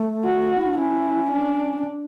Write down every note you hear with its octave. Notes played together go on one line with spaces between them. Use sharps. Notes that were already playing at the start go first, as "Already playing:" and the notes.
Already playing: A3
F#4
E4
D4
C#4 E4
D4
C#4
D4